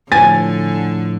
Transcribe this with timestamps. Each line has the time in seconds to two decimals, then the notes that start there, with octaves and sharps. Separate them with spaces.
0.12 A2 D3 F3 G#5 A6